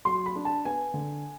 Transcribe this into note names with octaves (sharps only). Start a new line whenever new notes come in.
F#3 C6
B5
D4
A5
B3 G#5
D3